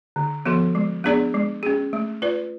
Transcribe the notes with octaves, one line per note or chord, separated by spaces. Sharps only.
D3
F3 B3 F#4 A4
G#3
B3 D4 G#4 D5
G#3
C#4 G#4
A3
F4 B4 D5